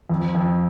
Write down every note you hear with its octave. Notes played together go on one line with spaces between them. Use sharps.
F2
F2